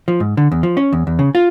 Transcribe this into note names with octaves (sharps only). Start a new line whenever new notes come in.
F3
G#2
D3
E2
F3
C#4
E2
E2
C#3
F4